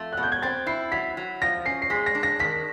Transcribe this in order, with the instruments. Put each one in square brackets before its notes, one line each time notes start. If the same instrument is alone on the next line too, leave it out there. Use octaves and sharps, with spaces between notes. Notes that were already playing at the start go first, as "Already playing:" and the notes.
Already playing: [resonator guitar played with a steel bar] F2 A3
[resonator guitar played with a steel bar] B2 [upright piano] F#6
[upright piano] G6
G#6
[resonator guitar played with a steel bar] C4 [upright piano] A6
[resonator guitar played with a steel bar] E4 [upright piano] C7
[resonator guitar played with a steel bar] F#3 [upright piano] B6
[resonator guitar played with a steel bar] F#3
[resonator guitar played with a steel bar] F3 [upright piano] A#6
[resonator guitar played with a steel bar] C#4 [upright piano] C7
[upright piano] C7
[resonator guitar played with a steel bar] G#3 [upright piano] B6
[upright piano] A#6
[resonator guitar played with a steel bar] D4
[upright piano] A#6
[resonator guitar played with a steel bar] D#3 [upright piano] B6